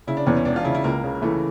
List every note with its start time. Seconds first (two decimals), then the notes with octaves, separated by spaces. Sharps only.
0.07 C#3 E4
0.17 D4
0.26 E2 C#4
0.36 C#4
0.45 E1 D4
0.56 F4
0.64 C#3 E4
0.75 E4
0.84 C#2 A#3
1.04 C#3
1.22 E3 A3